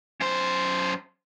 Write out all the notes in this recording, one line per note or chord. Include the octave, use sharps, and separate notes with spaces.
F#2 C5